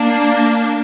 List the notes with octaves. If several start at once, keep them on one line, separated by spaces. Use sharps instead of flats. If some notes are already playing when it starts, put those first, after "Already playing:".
Already playing: A#3 D4